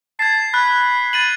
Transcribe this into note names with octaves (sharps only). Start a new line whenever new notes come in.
A5 G#6 C7
B5 F#6
A6 D#7 F#7